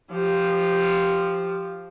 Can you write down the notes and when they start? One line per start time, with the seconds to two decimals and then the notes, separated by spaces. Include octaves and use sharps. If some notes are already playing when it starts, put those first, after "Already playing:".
0.12 F3 G4